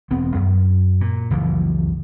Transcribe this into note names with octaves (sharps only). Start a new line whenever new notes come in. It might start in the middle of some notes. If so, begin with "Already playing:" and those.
E1 B3 C4
F#2
A#2
F#1 C#2 E3 F3